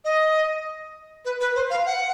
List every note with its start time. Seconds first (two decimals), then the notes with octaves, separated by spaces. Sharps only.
0.04 D#5
1.25 B4
1.40 B4
1.55 C5
1.70 F5
1.86 F#5